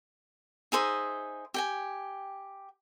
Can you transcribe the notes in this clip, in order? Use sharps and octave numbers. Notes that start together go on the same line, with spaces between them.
D#4 G#4 C5 E5
G4 G5 G#5